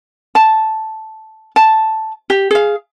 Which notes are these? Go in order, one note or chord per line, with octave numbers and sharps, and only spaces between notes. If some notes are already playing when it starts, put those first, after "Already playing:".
A5
A5
G4
G#4 F5